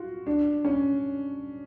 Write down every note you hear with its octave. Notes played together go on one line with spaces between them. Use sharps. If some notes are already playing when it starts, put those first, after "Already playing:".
Already playing: F4 F#4
D4
C#4